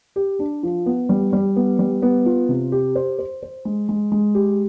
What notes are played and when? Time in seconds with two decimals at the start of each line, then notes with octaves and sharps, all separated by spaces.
0.16 G4
0.39 D4
0.63 F3
0.86 B3
1.09 G3
1.33 G3
1.56 B3
1.79 G3
2.02 B3
2.26 F4
2.49 C3
2.72 G4
2.95 C5
3.19 C5
3.43 C5
3.65 G#3
3.89 G#3
4.12 G#3
4.35 G4